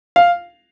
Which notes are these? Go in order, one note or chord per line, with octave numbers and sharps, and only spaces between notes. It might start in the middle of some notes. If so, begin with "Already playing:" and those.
F5